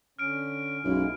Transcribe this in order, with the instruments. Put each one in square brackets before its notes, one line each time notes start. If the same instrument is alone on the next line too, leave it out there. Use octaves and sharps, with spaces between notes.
[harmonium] D3 C#4 [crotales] F6 D7
[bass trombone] B1 [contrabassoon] F#2 [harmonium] G#3 A#3 E4